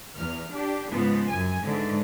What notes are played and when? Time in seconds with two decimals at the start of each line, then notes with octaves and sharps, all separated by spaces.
0.17 E2 F6
0.52 D4 G4
0.89 G#2 C#3 F3 B3
1.29 F#2 G#5
1.63 G#2 D3 E3